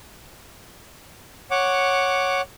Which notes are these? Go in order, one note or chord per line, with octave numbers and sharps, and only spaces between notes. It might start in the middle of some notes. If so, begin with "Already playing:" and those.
C#5 F#5 D6